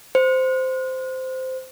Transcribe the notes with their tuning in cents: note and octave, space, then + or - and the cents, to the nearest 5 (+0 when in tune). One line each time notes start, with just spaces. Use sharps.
C5 -10